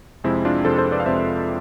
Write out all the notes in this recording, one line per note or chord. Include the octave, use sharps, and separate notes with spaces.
F2 C3 G#3 C4 E4
D4 F4
F2 C3 G#3 A4 C5
A4 C5
B4 D5
F5
F2 C3 G#3 C5 E5